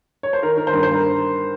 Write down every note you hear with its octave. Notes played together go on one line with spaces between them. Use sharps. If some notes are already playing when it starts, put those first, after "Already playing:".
C#5
C5
D#3 A#4
D#3 A#4
C5
G2 A#4
C5
G2
A#4